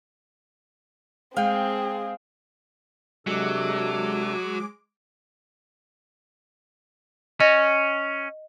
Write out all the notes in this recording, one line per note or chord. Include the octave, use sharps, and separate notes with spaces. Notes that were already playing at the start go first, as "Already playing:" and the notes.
G#3 C4 G#4 F5 G5
C3 F#3 G#3 D4 A4 D6
C#4 D#5